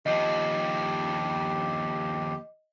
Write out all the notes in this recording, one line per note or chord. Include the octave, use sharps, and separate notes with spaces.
D#2 F3 G4 D#5